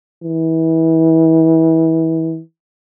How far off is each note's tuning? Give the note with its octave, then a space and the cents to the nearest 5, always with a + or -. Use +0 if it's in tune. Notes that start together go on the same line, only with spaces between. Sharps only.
E3 -30